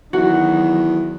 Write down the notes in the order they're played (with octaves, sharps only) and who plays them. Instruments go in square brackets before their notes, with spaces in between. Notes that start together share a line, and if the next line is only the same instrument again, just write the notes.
[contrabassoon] E2 [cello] D#3 F#3 [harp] F#4